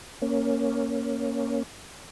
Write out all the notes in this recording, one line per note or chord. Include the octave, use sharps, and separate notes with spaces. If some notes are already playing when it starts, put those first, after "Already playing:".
A#3 C#4